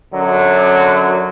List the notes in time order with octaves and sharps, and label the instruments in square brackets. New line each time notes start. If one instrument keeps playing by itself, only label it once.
[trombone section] F#2 D3 F#3